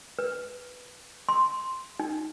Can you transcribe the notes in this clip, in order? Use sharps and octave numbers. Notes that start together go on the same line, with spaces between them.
B4
C6
D#4